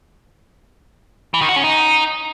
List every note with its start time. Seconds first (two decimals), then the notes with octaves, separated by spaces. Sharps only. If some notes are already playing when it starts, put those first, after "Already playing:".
1.34 E3
1.41 D#3
1.49 F#4
1.56 C#4
1.64 D#4